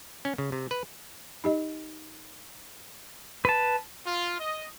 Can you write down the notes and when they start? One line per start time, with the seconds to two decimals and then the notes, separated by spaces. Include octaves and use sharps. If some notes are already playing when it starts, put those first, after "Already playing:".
0.25 C#4
0.38 C#3
0.52 C3
0.71 B4
1.44 D#4 G4 D#5
3.45 B4 A5
4.06 F4
4.39 D#5